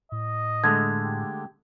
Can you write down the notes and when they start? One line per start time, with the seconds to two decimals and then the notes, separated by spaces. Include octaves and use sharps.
0.12 A2 D#5
0.64 D3 G#3 A3 G#6
1.04 G4